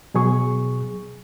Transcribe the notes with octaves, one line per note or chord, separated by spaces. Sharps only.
B2 F#3 G#4 C#6